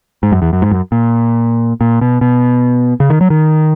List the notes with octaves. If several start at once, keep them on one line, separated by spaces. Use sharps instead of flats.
G#2
F#2
E2
F#2
G#2
F#2
A#2
A#2
B2
B2
C#3
D#3
F#3
D#3